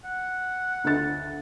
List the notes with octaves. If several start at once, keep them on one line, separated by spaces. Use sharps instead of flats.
F#5
D2 A6